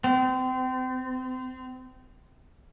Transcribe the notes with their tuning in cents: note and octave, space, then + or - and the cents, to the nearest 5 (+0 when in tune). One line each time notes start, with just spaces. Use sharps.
C4 -30